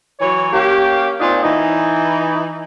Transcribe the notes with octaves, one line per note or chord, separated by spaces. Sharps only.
E3 F#3 C#5
A#3 C#4 G4
A#2 C4 D4 D#4 F4
E3 D#4